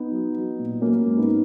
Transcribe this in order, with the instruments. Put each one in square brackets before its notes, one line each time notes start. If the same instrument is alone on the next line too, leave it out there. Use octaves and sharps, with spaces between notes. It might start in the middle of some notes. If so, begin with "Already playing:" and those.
Already playing: [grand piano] B3 D#4
F#3
F#3
A#2
F#3 A#3 C#4
G#2
B3 D#4